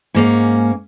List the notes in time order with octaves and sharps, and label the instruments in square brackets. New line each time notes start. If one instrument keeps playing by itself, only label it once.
[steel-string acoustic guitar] G#2 A#3 C#4